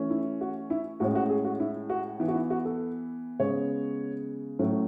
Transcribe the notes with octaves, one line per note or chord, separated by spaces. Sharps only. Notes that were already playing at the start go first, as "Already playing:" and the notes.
Already playing: E3 A3 C#4
E4
F#4
E4
A2 G#3 C#4 F#4
F#4
G#4
F#4
E4
F#4
E3 B3 E4
F#4
E4
F#4
A4
C#3 G#3 B3 C#5
A2 F#3 A3 C#4